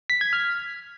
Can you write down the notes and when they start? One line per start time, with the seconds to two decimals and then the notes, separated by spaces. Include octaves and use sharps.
0.10 B6
0.21 G#6
0.33 F6